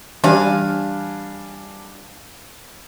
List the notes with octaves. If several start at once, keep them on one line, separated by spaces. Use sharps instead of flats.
E3 G3 D4 D5 F5 G#5